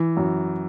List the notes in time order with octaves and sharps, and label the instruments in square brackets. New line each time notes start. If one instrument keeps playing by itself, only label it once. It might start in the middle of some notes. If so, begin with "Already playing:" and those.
Already playing: [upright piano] E3
F#2